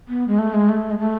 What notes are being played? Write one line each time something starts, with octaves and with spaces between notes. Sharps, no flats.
B3
G#3
A3
G#3
A3
G#3
A3